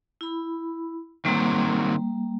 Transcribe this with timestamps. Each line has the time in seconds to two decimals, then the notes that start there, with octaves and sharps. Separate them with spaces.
0.21 E4 B5
1.25 D#3 F#3 G3 A#3 C4